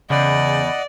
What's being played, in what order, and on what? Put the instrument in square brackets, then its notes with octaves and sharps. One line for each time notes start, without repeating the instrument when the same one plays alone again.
[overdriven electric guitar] E2 [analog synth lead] C#3 [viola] D5 [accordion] D#5 F#5